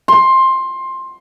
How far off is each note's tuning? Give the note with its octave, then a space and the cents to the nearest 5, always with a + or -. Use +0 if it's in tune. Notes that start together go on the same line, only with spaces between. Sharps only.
C6 +15